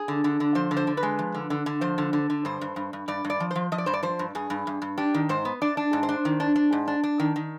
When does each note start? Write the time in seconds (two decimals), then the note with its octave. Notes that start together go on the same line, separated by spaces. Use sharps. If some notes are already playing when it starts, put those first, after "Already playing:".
Already playing: G#4
0.08 D3
0.24 D3
0.40 D3
0.55 F3 C5
0.71 D3
0.77 C5
0.87 D3
0.97 B4
1.03 G#3
1.19 F3
1.35 D3
1.50 D3
1.66 D3
1.81 F3 C5
1.98 D3
2.13 D3
2.30 D3
2.45 G2 C5
2.61 G2
2.76 G2
2.93 G2
3.08 G2 D5
3.25 G2
3.30 D5
3.40 F3
3.51 F3 C5
3.72 F3 D#5
3.78 D5
3.86 G2 C5
3.93 D5
4.03 F3 C5
4.19 G2
4.35 G2 G#4
4.50 G2
4.67 G2
4.82 G2
4.98 D4 G4
5.14 D#3
5.29 G#2 C5
5.45 B3
5.62 D4 D5
5.77 D4
5.93 G#2
6.03 C5
6.09 D4
6.25 D#3
6.40 D4
6.56 D4
6.73 G#2
6.88 D4
7.04 D4
7.20 D#3
7.36 D#3